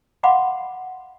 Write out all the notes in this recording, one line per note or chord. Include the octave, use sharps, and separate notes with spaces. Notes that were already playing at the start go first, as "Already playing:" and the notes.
D#5 F5 F#5 B5 C6 D6